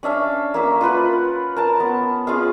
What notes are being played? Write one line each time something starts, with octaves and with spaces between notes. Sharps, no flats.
C#4 D4 E5 F5
A#3 C#4 E5
F4 A#4 B4 F#5
A#4 A5
B3
C#4 F4 G#4 F5